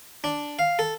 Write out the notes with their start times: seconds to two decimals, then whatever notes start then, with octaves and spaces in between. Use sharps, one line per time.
0.24 D4
0.59 F5
0.79 A4